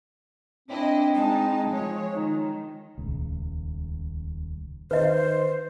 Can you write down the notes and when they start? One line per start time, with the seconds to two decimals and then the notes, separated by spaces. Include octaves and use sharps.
0.68 C4 D4 E4 D#5
1.15 G#3 D#4 A5
1.69 F3 C#5
2.15 D#3 D#4
2.98 D#1 C#2
4.91 D#3 B4 C5 D#5